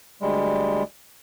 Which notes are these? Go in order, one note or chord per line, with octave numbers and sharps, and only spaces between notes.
D2 G3 G#3